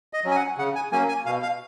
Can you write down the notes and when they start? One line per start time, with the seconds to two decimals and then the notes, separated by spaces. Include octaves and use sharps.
0.13 D#5
0.24 F#3 C#4
0.31 G#5
0.36 F#5
0.58 C#3 F#5
0.75 G#5
0.92 F#3 A#3 C#4 G#5
1.08 G#5
1.26 B2 F5
1.43 F5